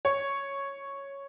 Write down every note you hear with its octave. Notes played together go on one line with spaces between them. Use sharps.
C#5